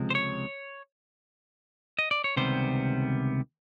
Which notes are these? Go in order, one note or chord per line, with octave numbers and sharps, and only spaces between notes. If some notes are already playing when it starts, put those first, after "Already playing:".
Already playing: C#2 C3 F3 G#3 C4
C5
C#5
D#5
D5
C#5
C#2 C3 D#3 G3 B3 C5